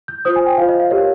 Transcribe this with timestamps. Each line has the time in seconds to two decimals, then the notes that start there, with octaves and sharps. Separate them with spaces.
0.08 G6
0.25 F4 C5 D#6
0.36 G#5
0.46 G5
0.58 F4 C5 F5
0.69 D#5
0.80 F5
0.90 G4 A#4 C#5 F5